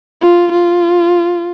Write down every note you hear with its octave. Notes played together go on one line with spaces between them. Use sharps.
F4
F4